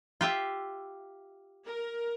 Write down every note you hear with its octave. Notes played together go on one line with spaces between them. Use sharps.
F4 G4 E5
A#4